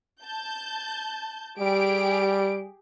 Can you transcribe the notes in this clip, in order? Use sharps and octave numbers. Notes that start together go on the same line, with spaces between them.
A5 G6
G3 G4 G#4 D7